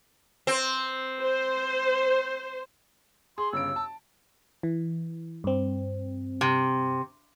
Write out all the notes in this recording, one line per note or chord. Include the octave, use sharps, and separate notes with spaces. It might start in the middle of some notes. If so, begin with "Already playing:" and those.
C4
C5
G#4 C6
G1 C#3 E6 D7
A5
E3
G2 C4
C3